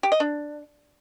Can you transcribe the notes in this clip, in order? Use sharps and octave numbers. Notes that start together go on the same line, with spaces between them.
G4
D#5
D4